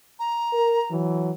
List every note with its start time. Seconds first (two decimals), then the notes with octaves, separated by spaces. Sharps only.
0.19 A#5
0.53 A#4
0.91 E3 F#3